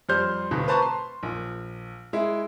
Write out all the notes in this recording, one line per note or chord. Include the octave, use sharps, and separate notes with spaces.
F2 G3 C5 C6 F6 G6
D1 B2
B4 C5 A5 A#5 C#6
C6
A#1
G#3 E4